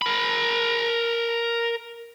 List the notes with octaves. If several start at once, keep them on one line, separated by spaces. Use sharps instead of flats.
A#4 B5